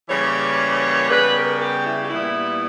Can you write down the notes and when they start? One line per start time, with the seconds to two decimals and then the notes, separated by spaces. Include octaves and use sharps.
0.08 C#3 E3 G3 A#3 C#5
1.09 C#3 G3 B3 B4
1.35 A#4
1.60 G4
1.85 E4
2.02 G4
2.09 A#2 G3 B3 E4